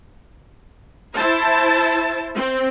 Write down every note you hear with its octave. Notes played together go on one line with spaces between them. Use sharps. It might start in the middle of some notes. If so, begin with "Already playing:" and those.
E4 C5 A5
C4